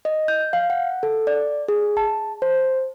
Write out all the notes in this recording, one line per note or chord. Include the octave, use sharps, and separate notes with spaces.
D#5
G6
F5
F#5
A4
D5
G#4
A5
C5